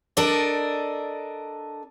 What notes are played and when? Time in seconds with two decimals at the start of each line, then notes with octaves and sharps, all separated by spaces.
0.17 D4 A4 A#4 D5 D#5